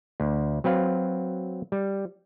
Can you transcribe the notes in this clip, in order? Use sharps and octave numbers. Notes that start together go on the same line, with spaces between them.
D2
F#3 C4 B4 F5
G3